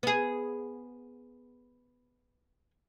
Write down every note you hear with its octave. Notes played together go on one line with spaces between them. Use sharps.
B3 G#4